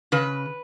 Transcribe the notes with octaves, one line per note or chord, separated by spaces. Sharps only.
C#3 B4